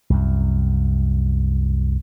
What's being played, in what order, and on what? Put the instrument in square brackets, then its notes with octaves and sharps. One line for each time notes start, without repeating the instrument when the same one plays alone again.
[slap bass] C2 F#2